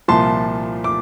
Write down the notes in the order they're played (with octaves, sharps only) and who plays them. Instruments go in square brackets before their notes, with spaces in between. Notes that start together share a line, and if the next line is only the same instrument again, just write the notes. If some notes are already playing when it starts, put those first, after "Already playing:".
[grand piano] C2 A#2 F3 A5 C6
D6